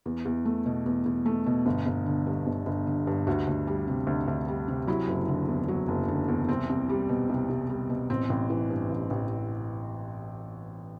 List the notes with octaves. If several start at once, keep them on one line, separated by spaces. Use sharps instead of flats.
E2
E2
A3
B2
E2
E2
A3
B2
G1
G1
D3
G2
G1
G1
D3
G2
D2 F#4
D2
G3
C3
D2
D2
G3
C3
F#3 E4
F#1
D3
E2
F#3
F#1
D3
E2
C2 C4
C2
G3
B2
C2
C2
G3
B2
A1 C4
A1
E3
G2
A1
A1